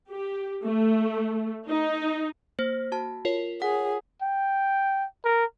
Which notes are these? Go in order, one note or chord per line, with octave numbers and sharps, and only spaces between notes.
G4
A3
D#4
A#3 C5
F#4 A5
F4 A#4 C#5
G#4 F#5
G5
A#4